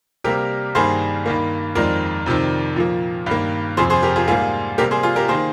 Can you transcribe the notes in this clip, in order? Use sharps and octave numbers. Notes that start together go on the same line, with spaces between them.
C3 G3 A#3 G4 A#4
G2 D#3 G3 A#3 G#4 C5
G2 D#3 A#3
F2 D#3 G#3 A#4 D5
F2 C3 D#3
A#2 F3 A#3
G2 D#3 A#3
F2 C3 F3 G#4 C5
G#4 C5
G4 A#4
F4 G#4
G#2 G3 A#3 F4 G#4
C3 G3 A#3 G4 A#4
G#4 C5
F4 G#4
G4 A#4
D#3 A#3 G#4 C5